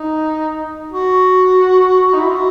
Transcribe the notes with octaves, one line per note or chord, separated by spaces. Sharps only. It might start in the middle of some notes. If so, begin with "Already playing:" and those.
Already playing: D#4
F#4
D#4
E4
F4
F#4